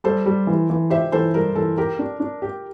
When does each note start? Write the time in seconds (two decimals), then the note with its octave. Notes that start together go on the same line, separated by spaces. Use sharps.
0.04 G3 A4 C5
0.26 G3
0.47 E3
0.70 E3
0.90 G4 C5 E5
1.12 E3 A4 C5
1.34 G3 A#4
1.55 E3 A4
1.77 G4 A#4
1.99 D4
2.20 D4
2.42 G4